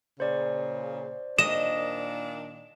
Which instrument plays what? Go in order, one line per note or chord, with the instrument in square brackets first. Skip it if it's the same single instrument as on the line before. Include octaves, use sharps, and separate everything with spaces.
[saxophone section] A#2 C#3 [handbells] C5 D5
[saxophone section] A#2 D#3 D4 [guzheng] D#5 [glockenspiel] E7